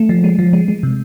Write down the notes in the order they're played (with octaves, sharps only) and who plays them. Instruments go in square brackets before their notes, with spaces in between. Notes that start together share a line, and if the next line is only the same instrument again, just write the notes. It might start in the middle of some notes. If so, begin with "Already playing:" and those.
Already playing: [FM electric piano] A3
F3
G#3
F3
G#3
G#3
C3